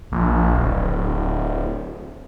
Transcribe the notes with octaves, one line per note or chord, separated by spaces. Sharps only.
A#1
D1